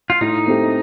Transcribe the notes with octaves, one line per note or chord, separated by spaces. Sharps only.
F4
A2 D#4
A3 C4 G4